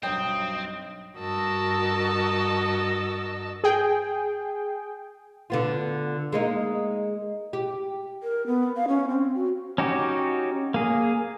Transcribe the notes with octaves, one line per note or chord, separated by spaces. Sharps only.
B1 G2 F#3 C4 D#5 G5
G2 F#4 A#4 D#5 A5 E6
G#4 G5
D3 B3 F4
G#3 A#3 D#4
G4
A#4
B3
F5
C#4
C4
F#4
C#4 D#4 F#4 G4
A#3 G#4